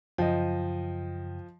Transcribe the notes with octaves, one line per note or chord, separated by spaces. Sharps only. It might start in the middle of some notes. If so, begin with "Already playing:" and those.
F#2 C#3 F3 D#5 G5